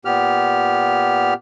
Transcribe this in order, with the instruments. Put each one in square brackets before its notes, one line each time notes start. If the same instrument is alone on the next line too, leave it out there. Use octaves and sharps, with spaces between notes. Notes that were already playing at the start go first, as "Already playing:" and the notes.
[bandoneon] A#2 B3 G4 F6